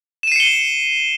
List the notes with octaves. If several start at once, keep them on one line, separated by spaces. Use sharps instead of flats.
C7 C#7 D#7 E7 G7